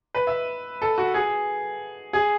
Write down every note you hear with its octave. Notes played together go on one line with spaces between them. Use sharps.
B4
E5
A4
F#4
G#4
G#4